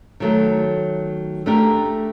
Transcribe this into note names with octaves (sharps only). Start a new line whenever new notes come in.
D#3 F#3 A3
A3 D4 G4 A#4